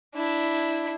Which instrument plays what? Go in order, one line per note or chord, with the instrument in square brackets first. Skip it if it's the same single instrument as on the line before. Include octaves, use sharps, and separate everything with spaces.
[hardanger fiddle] D4 E4